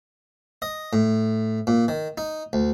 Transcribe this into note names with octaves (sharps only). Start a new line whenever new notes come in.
D#5
A2
A#2
D#3
D#4
D2